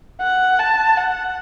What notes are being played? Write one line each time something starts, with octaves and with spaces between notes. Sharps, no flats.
F#5
A5
F#5